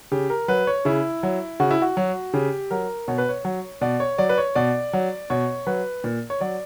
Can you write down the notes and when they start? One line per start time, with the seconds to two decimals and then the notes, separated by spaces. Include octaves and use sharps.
0.12 C#3 G4
0.30 A#4
0.48 F#3 B4
0.67 C#5
0.85 C#3 E4
1.23 F#3
1.60 C#3 F#4
1.71 E4
1.82 F#4
1.97 F#3
2.34 C#3 G4
2.71 F#3 A#4
3.08 B2 C#5
3.18 B4
3.29 C#5
3.45 F#3
3.81 B2 D5
4.00 C#5
4.18 F#3 D5
4.29 B4
4.38 C#5
4.55 B2 D5
4.93 F#3
5.30 B2 C#5
5.67 F#3 B4
6.04 A#2
6.30 C#5
6.41 F#3 D5